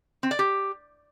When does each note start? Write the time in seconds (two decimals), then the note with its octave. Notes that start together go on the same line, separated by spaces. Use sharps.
0.23 C4
0.31 D5
0.39 G4